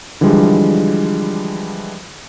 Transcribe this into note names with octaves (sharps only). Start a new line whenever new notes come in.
D3 E3 F3 G3 G#3